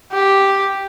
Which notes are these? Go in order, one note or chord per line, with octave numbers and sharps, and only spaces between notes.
G4